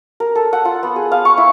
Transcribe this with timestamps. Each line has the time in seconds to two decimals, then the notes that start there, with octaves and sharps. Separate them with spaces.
0.20 A#4
0.35 A4
0.53 F#5
0.65 F4
0.83 B3
0.96 G#4
1.12 F5
1.25 C#6
1.38 E4